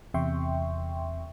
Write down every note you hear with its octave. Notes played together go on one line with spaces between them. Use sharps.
E2 C3 E5 G5 C6 C#6